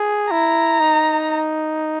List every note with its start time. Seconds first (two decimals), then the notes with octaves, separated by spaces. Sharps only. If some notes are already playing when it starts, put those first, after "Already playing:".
Already playing: G#4
0.31 E4 A#5
0.80 D#4